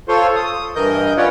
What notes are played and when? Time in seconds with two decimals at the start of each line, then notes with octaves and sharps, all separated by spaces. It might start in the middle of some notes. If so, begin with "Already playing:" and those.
0.08 F4 A4 C5 C#5 C6
0.36 D#6
0.76 G2 E3 A#4 D#5 G6
1.17 C#4 F4 B4 C#5 D5 F#5